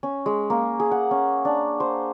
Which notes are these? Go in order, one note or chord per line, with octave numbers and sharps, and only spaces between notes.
C#4
G#3
A#3
G#4
F#5
C#4
D4
C5